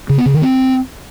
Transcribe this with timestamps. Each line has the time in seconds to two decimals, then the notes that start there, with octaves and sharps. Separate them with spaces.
0.10 C#3
0.18 B3
0.26 C#3
0.34 D#3
0.42 C4